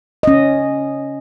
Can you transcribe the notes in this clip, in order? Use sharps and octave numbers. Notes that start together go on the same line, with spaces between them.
C#4 D#5